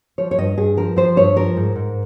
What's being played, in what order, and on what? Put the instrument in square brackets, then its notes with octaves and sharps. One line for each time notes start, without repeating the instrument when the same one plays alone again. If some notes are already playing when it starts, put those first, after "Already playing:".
[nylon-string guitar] F3 C#5
C#5
G2 D#5
G2 G#4
F3 A#4
F3 C5
G2 C#5
F3 A#4
G#2
G#2